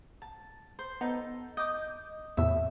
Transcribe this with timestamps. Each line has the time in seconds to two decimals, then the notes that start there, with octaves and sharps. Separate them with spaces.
0.22 A5
0.79 C5
1.01 B3 D#4 A4 A5
1.57 D#5 D6 G6
2.37 E2 A2 C3 E5